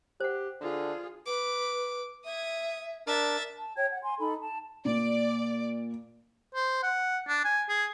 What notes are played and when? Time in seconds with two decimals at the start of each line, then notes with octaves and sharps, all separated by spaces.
0.20 G4 C5 F#5
0.61 D3 F4 G#4
1.26 B4 D6
2.25 E5 D#6 G#6
3.07 D4 A#4 E5 A6
3.56 A5
3.76 C#5 G5 G#6
3.90 F#5
4.04 G#5 C6
4.19 D#4 A4 B5
4.41 A5
4.85 A#2 D5
6.55 C5
6.83 F#5
7.28 D4
7.45 G#5
7.69 G#4